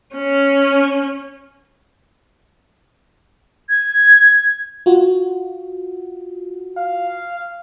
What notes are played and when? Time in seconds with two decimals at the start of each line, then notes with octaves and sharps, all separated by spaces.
0.16 C#4
3.69 G#6
4.86 F4 F#4
6.77 F5